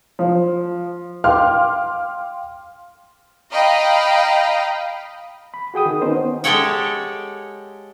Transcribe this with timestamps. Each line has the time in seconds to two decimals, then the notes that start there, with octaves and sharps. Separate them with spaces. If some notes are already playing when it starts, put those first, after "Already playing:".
0.19 F3
1.24 F5 G5 C6 D6 F6
3.51 D#5 F5 G5 A#5 B5
5.54 B5
5.74 F#4 G#4 G5 D#6
5.86 D#3
6.02 B3 C#4 D#4 C5
6.44 G#3 G4 A4 C#5 F#5 G5